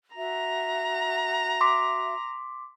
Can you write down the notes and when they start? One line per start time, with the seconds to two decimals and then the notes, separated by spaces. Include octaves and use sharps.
0.15 F#4 E5 A#5
1.61 C6 D6 B6